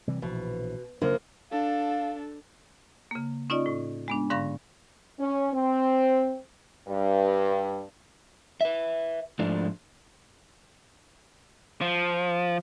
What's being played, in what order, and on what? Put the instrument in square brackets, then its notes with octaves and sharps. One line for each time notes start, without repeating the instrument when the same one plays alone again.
[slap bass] C3 E3 G3
[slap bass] A#1 E3 F3 [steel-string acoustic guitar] B2
[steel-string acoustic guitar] F#2 F3 A#3 [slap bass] C#3 F#3 D4
[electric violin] D4 A4 [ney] F5
[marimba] C#3 A#3
C#4 D#4 F4 D5 D#5
A2
G#3 B3 D4
G#2 D3 F5 B5 C#6 A#6
[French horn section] C#4
C4
G2
[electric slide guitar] B4 E5
G#2 F3 A3 D4
[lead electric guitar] F3